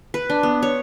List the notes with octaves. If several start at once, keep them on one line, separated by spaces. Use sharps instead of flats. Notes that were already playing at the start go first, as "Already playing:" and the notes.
B4
D4
B3
C#5